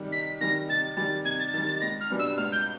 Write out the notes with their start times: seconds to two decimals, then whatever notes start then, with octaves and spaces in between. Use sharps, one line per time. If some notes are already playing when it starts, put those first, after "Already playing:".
Already playing: C3 D#3 G3
0.12 C3 B6
0.41 D#3 G3 A#6
0.69 C3 A6
0.97 D#3 G3 A6
1.25 C3 G#6
1.40 A6
1.54 D#3 G3 A6
1.67 A6
1.81 C#2 A#6
2.01 F6
2.10 B2 G3 B3 D4
2.19 E6
2.37 C#2 F6
2.52 G6